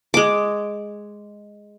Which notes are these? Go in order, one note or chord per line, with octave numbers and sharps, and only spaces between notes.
G#3 D6